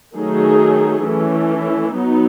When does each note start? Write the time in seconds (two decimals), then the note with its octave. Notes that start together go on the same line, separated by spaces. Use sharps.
0.15 D#3 F#3 A3 D#4 G#4
1.04 E3 A3 C#4
1.94 F#3 B3 D#4